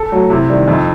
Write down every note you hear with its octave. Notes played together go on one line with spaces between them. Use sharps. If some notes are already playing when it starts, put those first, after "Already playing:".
Already playing: A4
F#3 A3
C3 E4
D#3 G3
F2 D#4